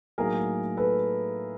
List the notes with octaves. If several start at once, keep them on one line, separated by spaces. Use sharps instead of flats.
A2 F#3 A#3 D#4 G#4 A#4
A4 B4